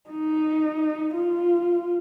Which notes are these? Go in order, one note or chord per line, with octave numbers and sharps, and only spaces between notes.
D#4
F4